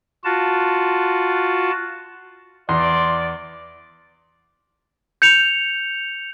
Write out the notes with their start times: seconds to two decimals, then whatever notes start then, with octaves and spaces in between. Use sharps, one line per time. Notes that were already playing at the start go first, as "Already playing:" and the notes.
0.24 F4 F#4 A5
2.69 E2 D5 C6
5.22 G6 C#7 F7